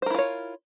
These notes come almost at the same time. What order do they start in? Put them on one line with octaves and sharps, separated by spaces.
C5 A#4 E4 F4 C#5